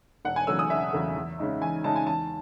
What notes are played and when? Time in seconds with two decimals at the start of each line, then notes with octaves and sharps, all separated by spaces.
0.25 E1 F#5
0.36 G#5
0.47 E2 C#3 F#3 A3 E6
0.59 D#6
0.70 E1 E5
0.93 E2 C#3 F#3 A3
1.16 E2
1.39 C#3 G#3 D#4
1.61 E2 G#5
1.84 C#3 G#3 D#4 A5
1.96 G#5
2.06 E2 A5